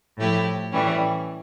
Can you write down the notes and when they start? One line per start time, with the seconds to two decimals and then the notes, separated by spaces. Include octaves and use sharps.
0.17 A2 F3 A3 E4 G4
0.71 A2 E3 G3 C#4